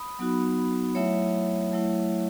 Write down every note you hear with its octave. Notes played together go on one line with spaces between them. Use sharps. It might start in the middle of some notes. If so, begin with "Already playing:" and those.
Already playing: B5 D#6
F#3 B3 D#4 F#4
F#3 A3 E4 C#5 E5
F#3 A3 E4